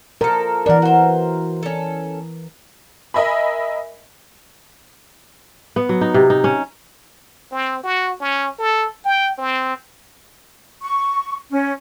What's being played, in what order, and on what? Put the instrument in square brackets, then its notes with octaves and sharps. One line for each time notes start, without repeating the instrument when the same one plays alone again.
[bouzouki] F3 A4 [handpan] A#4
[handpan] E3 A#4 [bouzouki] D4 F#5
[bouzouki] F#4 C5
C#4 A4
[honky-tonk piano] A#4 D#5 E5 G#5 B5
[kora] B3
F#3
D#4
C3
D#4
C#4
[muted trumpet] C4
F#4
C#4
A4
G5
C4
[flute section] C#6
C#4